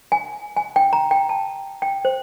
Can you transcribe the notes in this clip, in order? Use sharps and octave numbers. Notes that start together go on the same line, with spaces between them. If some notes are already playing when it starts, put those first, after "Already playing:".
G#5
G#5
G5
A#5
G5
A5
G5
C5